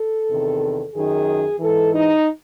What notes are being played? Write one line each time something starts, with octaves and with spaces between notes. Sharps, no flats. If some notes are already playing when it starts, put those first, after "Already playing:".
Already playing: A4
E2 C3 D#3
F#2 D#3 G#4
G#2 E3 A4
D#4